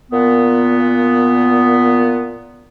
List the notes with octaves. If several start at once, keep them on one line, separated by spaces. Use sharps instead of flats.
A#2 B3